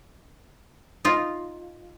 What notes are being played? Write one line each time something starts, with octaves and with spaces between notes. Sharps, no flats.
D#4 F4